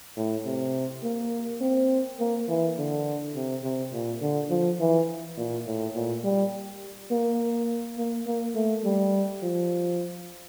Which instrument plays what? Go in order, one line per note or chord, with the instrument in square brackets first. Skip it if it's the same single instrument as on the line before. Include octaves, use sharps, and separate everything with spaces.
[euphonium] A2
C3
A#3
C4
A#3
E3
D3
C3
C3
A#2
D3
F3
E3
A#2
A2
A#2
G3
A#3
A#3
A#3
A3
G3
F3